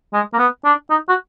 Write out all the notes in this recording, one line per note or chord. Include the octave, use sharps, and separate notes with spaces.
G#3
A#3
B3
D4
D#4
F#4